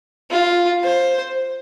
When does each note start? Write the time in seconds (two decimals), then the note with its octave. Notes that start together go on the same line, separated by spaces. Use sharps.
0.31 F4
0.83 C5